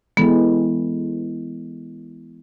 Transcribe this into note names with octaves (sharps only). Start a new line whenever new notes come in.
E3 G#3 B3 A4